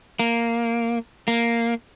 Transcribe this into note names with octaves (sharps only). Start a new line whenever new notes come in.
A#3
A#3